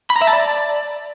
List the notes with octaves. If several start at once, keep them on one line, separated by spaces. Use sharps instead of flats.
B5
A#5
E5
A5
D5